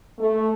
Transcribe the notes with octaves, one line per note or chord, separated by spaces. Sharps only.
A3